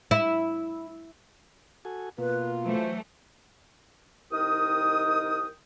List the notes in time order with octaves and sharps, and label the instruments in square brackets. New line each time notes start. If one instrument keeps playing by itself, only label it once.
[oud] E4
[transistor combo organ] F#4 A4 G#5
[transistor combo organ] B2 A#3 [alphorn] F4 [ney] B4
[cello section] E3 F#3 A3 [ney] C5
[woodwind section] C2 D#3 A#4 D#5 G5 D#6